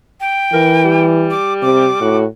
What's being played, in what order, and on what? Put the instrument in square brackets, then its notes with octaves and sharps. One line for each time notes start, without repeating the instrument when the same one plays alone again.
[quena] G5
[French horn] E3 [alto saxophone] A#4
[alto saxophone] G3
[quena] D6
[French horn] C3 [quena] D6
[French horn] A2 [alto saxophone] F#4